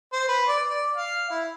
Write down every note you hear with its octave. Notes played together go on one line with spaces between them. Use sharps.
C5
B4
D5
D5
F5
E4